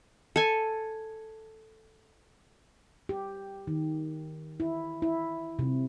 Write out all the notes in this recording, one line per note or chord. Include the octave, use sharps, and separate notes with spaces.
A4 G#5
G4
D#3
E4
E4
C3